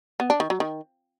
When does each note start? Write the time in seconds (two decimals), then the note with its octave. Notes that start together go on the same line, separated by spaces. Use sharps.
0.20 B3
0.30 D4
0.40 D#3
0.50 F#3
0.60 D#3